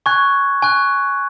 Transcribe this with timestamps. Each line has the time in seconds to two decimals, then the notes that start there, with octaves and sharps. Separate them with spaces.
0.06 G#5 C#6 F#6 G#6
0.62 G#5 C#6 F#6